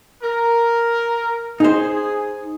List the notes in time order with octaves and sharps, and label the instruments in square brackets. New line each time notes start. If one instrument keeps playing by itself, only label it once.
[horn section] A#4
[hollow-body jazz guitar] D#4 C5 [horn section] G#4